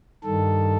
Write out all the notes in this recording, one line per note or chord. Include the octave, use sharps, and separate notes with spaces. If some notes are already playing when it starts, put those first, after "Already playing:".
G2 D#3 A4